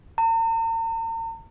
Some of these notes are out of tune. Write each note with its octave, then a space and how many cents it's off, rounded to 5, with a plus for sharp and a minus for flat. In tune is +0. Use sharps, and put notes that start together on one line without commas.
A#5 -45